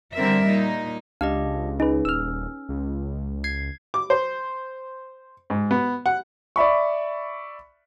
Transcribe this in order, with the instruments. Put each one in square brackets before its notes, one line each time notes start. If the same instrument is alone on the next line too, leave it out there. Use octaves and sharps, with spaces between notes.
[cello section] D3 G3 C4 A#4 E5
A#2 D#4
[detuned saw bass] C#2 [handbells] D4 G4 D#5 [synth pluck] F5
[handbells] C#4 [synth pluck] D#4 G#4 B4
[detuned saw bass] D#1 [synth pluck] E6 F6
[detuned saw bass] C#2
[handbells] G#6 [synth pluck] C7
[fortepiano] D6
C5
G#2
B3
F#5
[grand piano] D5 E5 B5 C#6